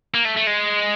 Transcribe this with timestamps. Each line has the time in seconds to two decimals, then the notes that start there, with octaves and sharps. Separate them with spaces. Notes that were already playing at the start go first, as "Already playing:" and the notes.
0.14 A#3
0.25 A3
0.37 A3
0.47 G#3